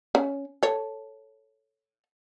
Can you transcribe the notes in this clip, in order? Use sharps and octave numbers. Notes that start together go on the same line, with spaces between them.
C#4
A4 C#5